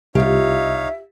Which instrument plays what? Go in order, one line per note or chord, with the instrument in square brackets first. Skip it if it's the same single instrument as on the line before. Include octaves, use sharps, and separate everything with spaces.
[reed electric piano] C2 [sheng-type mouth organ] D#4 C#5 F5 [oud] F4 G4 [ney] E5